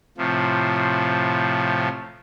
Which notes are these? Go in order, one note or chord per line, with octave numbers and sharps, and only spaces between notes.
A2 C3 F3